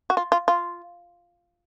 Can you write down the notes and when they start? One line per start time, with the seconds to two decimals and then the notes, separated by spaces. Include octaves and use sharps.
0.10 F#4
0.17 F4
0.32 F4
0.48 F4